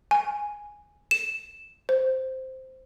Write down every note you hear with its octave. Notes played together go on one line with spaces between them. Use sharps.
G#5
E7
C5